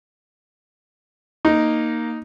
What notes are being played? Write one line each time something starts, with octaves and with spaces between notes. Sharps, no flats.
A#3 D#4